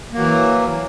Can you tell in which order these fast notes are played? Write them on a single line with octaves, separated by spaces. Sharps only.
A#3 F#3 E3